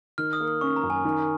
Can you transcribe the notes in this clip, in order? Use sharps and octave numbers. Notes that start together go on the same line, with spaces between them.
D#3 F6
D#6
A#3
D#6
C#4 C#6
A#5
F#2
G#5
D#3